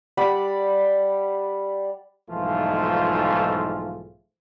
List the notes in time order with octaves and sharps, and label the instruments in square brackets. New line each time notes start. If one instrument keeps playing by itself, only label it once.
[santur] G3 D5 F#5 B5
[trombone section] B1 G#2 E3 F3 A3 F4